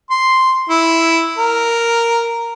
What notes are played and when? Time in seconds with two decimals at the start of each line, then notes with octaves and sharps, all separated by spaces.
0.10 C6
0.70 E4
1.38 A#4